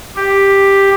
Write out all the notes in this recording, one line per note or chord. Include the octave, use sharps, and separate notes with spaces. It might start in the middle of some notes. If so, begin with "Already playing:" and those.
G4